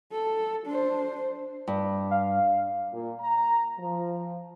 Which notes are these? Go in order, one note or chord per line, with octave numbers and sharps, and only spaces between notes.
A4
D4 C5
G2
F5
A#2
A#5
F3